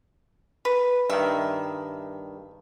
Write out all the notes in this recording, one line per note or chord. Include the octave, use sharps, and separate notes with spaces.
B4
G2 D#3 E5